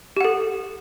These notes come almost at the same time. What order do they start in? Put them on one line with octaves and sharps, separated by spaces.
G4 F#5 A4